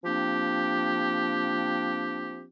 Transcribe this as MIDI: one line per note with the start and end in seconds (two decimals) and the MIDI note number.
0.04 2.45 53
0.04 2.45 58
0.04 2.45 60
0.04 2.45 62
0.04 2.45 67